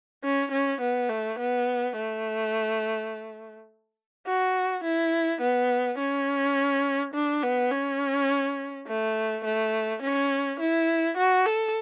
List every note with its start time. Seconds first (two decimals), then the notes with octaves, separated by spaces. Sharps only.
0.24 C#4
0.52 C#4
0.81 B3
1.09 A3
1.39 B3
1.97 A3
4.27 F#4
4.84 E4
5.41 B3
5.99 C#4
7.14 D4
7.43 B3
7.71 C#4
8.88 A3
9.45 A3
10.02 C#4
10.60 E4
11.17 F#4
11.46 A4